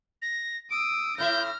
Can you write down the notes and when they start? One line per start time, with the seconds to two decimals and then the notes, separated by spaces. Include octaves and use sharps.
0.22 A#6
0.71 D#6 E6 D7
1.18 A2 E4 E5 F6 G6 A#6